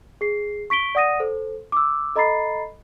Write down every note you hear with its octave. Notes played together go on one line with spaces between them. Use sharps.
G#4 C7
C#6 B6 D7 G7
D5 F#5 D#6 A#6 D#7
A4 C5
D6 E6
A4 D#5 A#5 B5 A6 C7